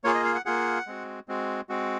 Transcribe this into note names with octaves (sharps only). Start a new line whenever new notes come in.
A#3 F4 G#4 C#5
D#5
F5
F#5
A#3 F4 G#4 F#5
G#3 C4 F#4
G#3 C4 F#4
G#3 C4 F#4